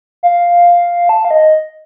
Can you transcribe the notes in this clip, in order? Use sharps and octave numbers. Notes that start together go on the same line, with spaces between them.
F5
A5
F5
D#5